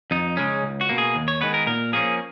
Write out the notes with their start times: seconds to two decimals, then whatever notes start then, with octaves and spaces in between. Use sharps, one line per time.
0.11 F2 D#4
0.37 C#3 G#3 C#4
0.63 C#2
0.81 F#4
0.89 B2 A#3
0.98 G#4
1.15 D#2
1.28 C#5
1.41 D#3 G#3 B3 B4
1.54 A#4
1.67 A#2 A#4
1.93 F3 A#3 C#4 G#4